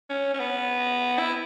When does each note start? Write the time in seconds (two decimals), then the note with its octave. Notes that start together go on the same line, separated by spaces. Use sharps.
0.10 C#4
0.34 C#4
0.40 B3
1.19 E4